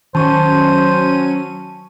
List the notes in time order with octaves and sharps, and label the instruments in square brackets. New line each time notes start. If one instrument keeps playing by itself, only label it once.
[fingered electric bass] D#3 [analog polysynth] F#3 C#4 D#7 [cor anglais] C5 [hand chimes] A5 C#6